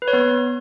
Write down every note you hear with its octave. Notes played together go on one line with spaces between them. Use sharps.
B4
C#5
B3